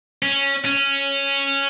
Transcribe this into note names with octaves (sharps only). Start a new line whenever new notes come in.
C#4
C#4